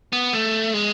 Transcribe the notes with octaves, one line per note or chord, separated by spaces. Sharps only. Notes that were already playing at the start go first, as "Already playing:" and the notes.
B3
A3
G#3